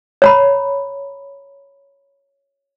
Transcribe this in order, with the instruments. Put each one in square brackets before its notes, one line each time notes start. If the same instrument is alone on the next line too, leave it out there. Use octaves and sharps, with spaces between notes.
[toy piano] C#5 A#5 B5